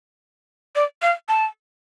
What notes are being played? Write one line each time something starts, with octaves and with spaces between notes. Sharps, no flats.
D5
F5
A5